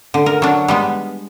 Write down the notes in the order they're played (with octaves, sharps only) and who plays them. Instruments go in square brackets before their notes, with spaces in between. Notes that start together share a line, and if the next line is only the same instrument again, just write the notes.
[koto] D3
A#4
F#3 D4
G3 G#3 B3